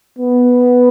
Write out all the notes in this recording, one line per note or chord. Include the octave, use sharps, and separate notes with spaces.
B3